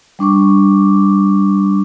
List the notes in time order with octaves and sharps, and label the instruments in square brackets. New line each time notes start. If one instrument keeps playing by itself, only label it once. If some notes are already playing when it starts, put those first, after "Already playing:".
[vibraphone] G3 D4 C#6 D6